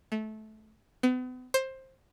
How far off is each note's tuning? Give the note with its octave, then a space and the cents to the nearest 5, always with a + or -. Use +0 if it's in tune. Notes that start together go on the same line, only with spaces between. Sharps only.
A3 -20
B3 +40
C5 +15